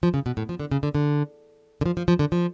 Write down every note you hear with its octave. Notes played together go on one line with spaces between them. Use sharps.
F3
C#3
B2
A2
F3
D3
C#3
D3
D3
D3
F3
F3
F3
D3
F3